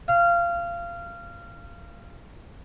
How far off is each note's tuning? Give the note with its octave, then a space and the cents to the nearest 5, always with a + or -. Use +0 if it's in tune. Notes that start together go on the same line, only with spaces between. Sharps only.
F5 -20